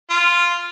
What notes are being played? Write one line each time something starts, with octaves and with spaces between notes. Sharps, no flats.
F4